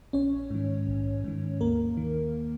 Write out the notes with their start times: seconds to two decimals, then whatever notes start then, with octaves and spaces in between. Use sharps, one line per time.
0.13 A#1 C#4 C#5
0.50 G#2 D#3
0.87 A#1
1.24 G#2 D#3
1.61 D#2 A#3 A#4
1.97 D#3